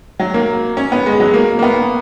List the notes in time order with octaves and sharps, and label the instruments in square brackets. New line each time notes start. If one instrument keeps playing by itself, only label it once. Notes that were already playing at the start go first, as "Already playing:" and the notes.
[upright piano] F#3
A#3
C#4
B3
G#3
F#3
A#3
A#3
B3